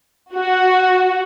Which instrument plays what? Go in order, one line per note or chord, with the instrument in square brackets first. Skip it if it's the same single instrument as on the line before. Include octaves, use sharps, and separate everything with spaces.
[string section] F#4